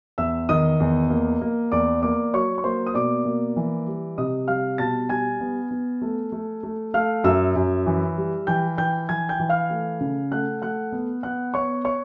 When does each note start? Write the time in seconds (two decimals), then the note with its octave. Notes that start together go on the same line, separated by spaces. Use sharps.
0.18 E2 E5 E6
0.49 D#3 D#5 D#6
0.80 E2
1.10 A#3
1.41 A#3
1.72 E2 D5 D6
2.02 A#3 D5 D6
2.34 F#3 C#5 C#6
2.58 C#6
2.64 A#3 C5 C6
2.87 D#6
2.94 B2 D5 D6
3.25 A#3
3.56 E3
3.87 G3
4.18 C3 D#5 D#6
4.48 G3 F5 F6
4.78 B2 A5 A6
5.09 G3 G#5 G#6
5.41 B3
5.71 B3
6.02 A3
6.32 A3
6.63 A3
6.94 A3 F5 F6
7.24 F#2 E5 E6
7.55 F#2
7.86 E3
8.17 G3
8.47 E3 G5 G6
8.77 E3 G5 G6
9.09 E3 G#5 G#6
9.29 G5 G6
9.40 E3
9.49 F5 F6
9.70 A3
10.01 C#3
10.31 A3 F#5 F#6
10.62 A3 F#5 F#6
10.92 B3
11.23 B3 F#5 F#6
11.54 B3 C#5 C#6
11.85 C#5 C#6